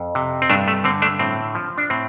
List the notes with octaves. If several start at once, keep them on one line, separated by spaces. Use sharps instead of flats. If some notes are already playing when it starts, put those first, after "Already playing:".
Already playing: F2
C3
C4
G2 A3 D4
A3
D3 C4
A3 D4
A2 C4
F3
D4
A2 C4